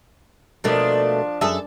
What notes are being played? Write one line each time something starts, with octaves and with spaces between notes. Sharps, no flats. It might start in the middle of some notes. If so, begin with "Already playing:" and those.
B2 F3 A3 A#3 D4
F#2 G#4 A4 E5